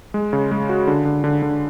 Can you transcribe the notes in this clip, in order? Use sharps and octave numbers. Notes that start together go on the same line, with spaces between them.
G#3
C#3
G#3
F#4
D3
D3
D3
D3